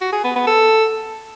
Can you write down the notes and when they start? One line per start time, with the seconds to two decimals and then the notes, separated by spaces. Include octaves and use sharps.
0.01 F#4
0.13 G#4
0.24 B3
0.36 B3
0.47 A4